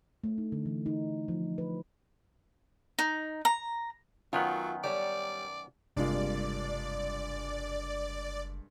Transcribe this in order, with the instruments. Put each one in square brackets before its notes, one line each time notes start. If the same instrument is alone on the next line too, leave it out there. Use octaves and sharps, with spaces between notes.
[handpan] A3
D#4
D3
E3
D#4
F3
B4
[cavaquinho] D#4
A#5
[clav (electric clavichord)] F#2 D#3 B3 [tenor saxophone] F#3 [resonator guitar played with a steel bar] F4
[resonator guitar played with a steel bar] G3 C#5 [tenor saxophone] D5
[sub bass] F#1 [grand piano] G2 G#3 A#3 [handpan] C3 G3 F4 [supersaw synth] D5